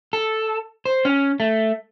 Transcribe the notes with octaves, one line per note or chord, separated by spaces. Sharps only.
A4
C5
C#4
A3